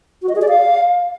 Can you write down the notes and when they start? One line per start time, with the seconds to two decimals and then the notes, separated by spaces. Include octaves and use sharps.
0.22 F#4
0.29 D#5
0.35 G#4
0.42 D5
0.48 F5